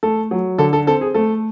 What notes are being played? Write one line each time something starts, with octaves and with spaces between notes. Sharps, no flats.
A3 A4
F#3
D3 A4
A4
C4 A4
G#4
A3 A4